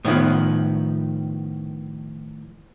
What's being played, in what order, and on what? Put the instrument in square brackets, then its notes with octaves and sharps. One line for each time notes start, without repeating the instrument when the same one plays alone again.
[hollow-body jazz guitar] A2 D#3 F3 B3